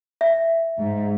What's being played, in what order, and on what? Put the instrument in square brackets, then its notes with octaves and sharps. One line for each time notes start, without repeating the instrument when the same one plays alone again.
[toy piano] E5
[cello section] G#2